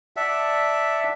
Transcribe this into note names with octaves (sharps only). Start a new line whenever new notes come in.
D5 E5 F#5 A5